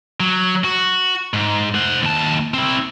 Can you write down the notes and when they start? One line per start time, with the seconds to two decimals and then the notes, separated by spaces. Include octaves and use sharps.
0.20 F#3
0.65 F#4
1.33 G#2
1.75 C5 F#5
2.03 D#2 A5
2.54 C4 E4